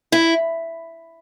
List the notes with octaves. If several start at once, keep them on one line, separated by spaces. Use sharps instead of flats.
E4